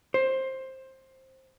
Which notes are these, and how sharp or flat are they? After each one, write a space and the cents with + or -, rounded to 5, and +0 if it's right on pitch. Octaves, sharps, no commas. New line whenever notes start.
C5 +15